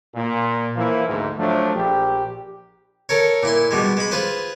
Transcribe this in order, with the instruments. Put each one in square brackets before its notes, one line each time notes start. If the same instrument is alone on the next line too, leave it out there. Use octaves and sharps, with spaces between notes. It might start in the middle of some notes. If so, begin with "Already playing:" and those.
[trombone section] A#2
E3 F3 A#3 E4
D2 G#2
F3 F#3 A3 D4
A#1 G4
[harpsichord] A4 A#4 C#5
A#2 E4 C6
B2 G3 G#3
G#3 B5
F4 G#4 B4 C5